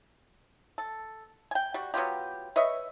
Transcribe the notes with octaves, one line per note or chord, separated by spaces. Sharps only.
A4
G5 G#5
G3 F#4
F#3 B3 F4 G4
B4 C#5 D#5 E5